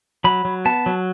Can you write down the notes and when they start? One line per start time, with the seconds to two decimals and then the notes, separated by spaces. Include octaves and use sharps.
0.24 F#3 B5
0.45 F#3
0.65 B3 A5
0.86 F#3